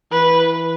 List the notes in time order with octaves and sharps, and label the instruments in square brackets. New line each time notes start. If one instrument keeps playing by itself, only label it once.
[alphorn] E3 [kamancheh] B4